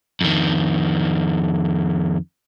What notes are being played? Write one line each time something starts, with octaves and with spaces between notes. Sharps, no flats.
F2 D#3